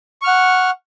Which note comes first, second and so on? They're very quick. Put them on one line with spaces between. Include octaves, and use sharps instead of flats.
C#6 F6 F#5